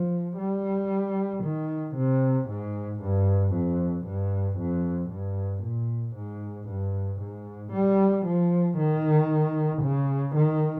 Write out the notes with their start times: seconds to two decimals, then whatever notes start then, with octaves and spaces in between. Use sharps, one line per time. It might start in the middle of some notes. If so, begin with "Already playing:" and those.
Already playing: F3
0.38 G3
1.44 D#3
1.96 C3
2.49 G#2
3.01 G2
3.53 F2
4.06 G2
4.58 F2
5.11 G2
5.63 A#2
6.16 G#2
6.68 G2
7.21 G#2
7.73 G3
8.26 F3
8.78 D#3
9.82 C#3
10.35 D#3